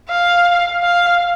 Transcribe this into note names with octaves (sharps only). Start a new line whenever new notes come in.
F5
F5